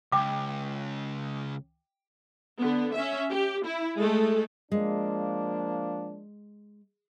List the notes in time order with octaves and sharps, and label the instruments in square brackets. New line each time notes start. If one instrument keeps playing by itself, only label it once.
[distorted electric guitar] C#2 [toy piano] G5 D6
[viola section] D3 B3
C#4 E5
G4
E4
G#3 A3 A4
[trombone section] F3 A#3 D4 [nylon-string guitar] G#3